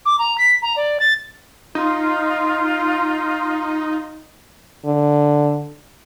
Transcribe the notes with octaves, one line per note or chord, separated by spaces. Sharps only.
D6
A#5
B6
A#5
D5
A6
D#4 F4
D3